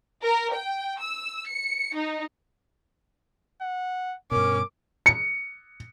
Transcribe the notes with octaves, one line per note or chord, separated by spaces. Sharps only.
A#4
G5
E6
C#7
D#4
F#5
G2 B2 C#4 A#4 D6
C#7